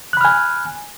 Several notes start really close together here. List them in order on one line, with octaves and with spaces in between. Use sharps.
F#6 B5 F6 G#5